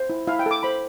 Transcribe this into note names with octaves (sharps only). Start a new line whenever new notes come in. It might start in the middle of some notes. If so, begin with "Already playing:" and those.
Already playing: C5
E4
E4 F5
G5
A4 D6
C5 B5